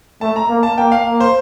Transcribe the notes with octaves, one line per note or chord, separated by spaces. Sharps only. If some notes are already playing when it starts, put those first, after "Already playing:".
A3 A5
A#5
A#3
A5
A#3 G5
F5
A#3
C5